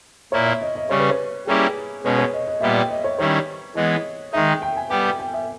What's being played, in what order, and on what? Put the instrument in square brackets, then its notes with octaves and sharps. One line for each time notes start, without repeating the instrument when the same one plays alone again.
[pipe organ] A#2 A#3 E4 [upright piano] C#5
[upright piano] E5
D#5
D#5
[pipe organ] C#3 G3 C#4 [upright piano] C#5
[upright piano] B4
C#5
[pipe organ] G3 A#3 C#4 E4 G4 [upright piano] G#4
[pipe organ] B2 G#3 C#4 [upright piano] B4
[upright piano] C#5
D#5
D#5
[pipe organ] A#2 G3 B3 G4 [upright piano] E5
[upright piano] G5
D#5
C#5
[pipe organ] D#3 G3 C#4 E4 [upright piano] C#5
[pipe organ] E3 G#3 B3 [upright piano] D#5
[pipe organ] D#3 G#3 D#4 [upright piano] E5
[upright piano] G5
G5
G#5
[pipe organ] G3 B3 G4 [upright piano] G5
[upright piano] G5
G5
E5